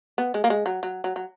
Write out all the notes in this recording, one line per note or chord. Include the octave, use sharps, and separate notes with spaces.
B3
G#3
A#3
G#3
F#3
F#3
F#3
F#3